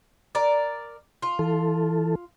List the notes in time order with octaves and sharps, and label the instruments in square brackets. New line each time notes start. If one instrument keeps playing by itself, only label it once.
[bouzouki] A#4 D5
F4
[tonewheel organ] E3 A4